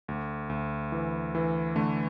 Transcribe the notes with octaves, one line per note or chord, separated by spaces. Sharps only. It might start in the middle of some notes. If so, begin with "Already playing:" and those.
D2
D2
E3
E3
D3 A3